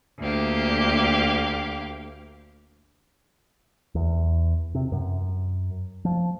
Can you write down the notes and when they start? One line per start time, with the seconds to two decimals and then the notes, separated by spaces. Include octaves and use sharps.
0.20 D2 A#3 G4 F5
3.95 E2
4.75 C3
4.92 F#2
6.05 F3